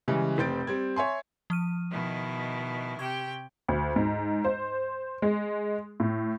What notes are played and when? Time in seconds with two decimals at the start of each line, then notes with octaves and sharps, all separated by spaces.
0.08 C#3 E3 G3 G#3
0.38 F1 C4 G6 A6 D7
0.67 G3 C4 G#6
0.96 C#5 E5 G#5 C6
1.50 F3 F6 D#7
1.90 B2 D#3 E4
2.99 C3 G4 G5 C#6 G#6
3.68 D2
3.96 G#2
4.45 C5
5.22 G#3
6.00 A2